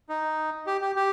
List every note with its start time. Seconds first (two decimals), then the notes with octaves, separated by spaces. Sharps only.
0.09 D#4
0.67 G4
0.81 G4
0.96 G4